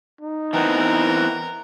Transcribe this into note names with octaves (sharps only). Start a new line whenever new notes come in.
D#4
E3 B3 C4 A#4